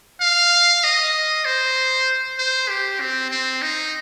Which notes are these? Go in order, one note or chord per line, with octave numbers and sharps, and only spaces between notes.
F5
D#5
C5
C5
G4
C4
C4
D#4